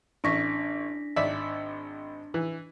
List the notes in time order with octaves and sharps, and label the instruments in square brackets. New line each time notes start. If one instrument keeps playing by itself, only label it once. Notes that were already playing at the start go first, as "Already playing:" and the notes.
[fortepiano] A1 C#6 [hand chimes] D4 A#6 B6
[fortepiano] G#1 D5 E5
E3